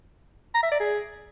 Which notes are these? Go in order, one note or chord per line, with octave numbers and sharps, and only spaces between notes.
A#5
E5
D5
G#4